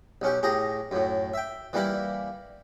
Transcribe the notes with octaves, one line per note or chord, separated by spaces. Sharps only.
B1 C#4 G4
A2 G4 G#4 A#5
F#2 A2
E5 G5
E3 G3 A#3 E4 G4